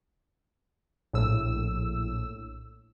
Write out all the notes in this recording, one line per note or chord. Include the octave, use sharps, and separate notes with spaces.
A#1 A2 E6